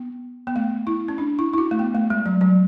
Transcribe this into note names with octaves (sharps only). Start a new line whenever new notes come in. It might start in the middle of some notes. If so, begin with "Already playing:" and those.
Already playing: B3
B3
A3
E4
C#4
D4
E4
E4
F#4
A3
B3
A3
G#3
F#3
F#3